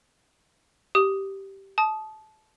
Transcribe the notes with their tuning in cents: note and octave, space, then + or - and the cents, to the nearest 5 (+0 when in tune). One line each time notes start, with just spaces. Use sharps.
G4 -10 D#6 +0
A5 -20 D#6 +0